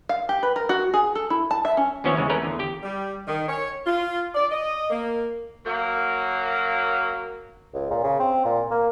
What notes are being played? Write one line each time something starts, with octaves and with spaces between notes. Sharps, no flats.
F5
G4
B4
A#4
F#4
G#4
A4
E4
A5
E5
C#4
D#2 F3 B3 C#4 C#5 E5
E2 C#3 G#3 C#4
A3 C#4 A#4 B4
E2 D3
G4 G5
G3
D#3
C#5
F4
D5
D#5
A#3
F#3 A#3
C#2
A#2
C#3
C4
A#2
A#3